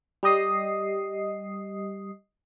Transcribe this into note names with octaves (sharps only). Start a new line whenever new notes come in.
G3 G4 D#5 D#6 C7